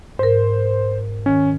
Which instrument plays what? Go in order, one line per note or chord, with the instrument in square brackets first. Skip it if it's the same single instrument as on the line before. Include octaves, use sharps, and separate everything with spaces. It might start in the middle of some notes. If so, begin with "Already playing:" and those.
[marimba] G#2 A#4 [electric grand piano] C5
[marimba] D#3 [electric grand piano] C#4